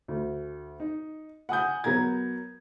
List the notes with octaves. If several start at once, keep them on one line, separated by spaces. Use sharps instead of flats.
D2
D#4
F#5 G#5 D#6 G6
F#3 B3 A#4 A#5 G#6